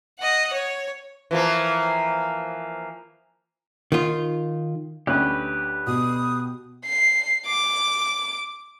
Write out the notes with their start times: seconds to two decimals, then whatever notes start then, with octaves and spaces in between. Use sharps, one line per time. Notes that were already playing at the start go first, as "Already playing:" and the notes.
0.19 D#5 F#5
0.53 C#5
1.31 E3 F3 A#3
3.92 D#3 F4
5.07 D2 C#4 G4 B4 F#6
5.87 B2 D#6
6.85 C7
7.47 D6